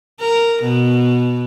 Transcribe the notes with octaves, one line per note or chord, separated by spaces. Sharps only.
A#4
B2